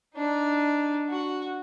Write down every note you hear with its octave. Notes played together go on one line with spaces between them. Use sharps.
D4 D#4
F#4